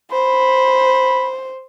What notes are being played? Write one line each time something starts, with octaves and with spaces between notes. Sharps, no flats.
C5 B5